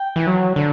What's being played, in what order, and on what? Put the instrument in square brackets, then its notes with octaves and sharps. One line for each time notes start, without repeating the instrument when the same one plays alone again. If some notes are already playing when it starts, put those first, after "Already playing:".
Already playing: [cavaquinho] G5
[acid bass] E3
F#3
D3